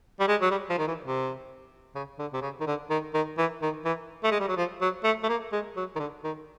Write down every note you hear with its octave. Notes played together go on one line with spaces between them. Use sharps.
G3
G#3
F#3
G3
F3
D#3
E3
C3
C#3
D3
C3
C#3
D#3
D3
D#3
D#3
E3
D#3
E3
A3
G#3
G3
F#3
F3
F#3
A3
A3
A#3
G#3
F#3
D#3
D3
D#3